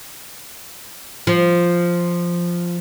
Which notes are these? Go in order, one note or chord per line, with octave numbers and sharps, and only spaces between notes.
F3